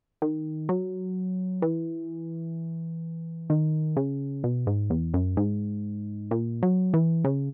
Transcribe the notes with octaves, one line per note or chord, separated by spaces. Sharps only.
D#3
F#3
E3
D#3
C#3
B2
G#2
E2
F#2
G#2
A#2
F#3
E3
C#3